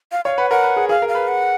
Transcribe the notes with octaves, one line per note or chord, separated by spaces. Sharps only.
F5
C#5 F5
B4 F#5
A#4 F#5
B4
G#4
G#4 F5
A#4
F5
B4
F#5